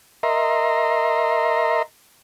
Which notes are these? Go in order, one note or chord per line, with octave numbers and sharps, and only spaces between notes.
A#4 D#5 E5 A#5 C6